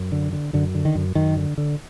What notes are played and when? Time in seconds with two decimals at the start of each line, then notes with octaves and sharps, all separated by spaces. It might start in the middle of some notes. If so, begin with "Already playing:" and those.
Already playing: F#2
0.12 D3
0.33 D3
0.53 F#2 D3
0.75 D3
0.85 D#3
0.95 F#2
1.15 F#2 D#3
1.37 D3
1.58 D3